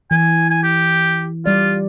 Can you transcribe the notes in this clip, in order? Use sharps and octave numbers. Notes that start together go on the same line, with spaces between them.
E3 G#5
G#5
G4
G3 F4 D5